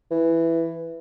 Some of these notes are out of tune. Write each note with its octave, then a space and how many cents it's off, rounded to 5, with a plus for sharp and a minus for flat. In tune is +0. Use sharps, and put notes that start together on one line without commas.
E3 +5